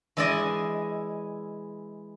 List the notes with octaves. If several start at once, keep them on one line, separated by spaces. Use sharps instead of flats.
E3 G#3 E4 G#4 D5 D#5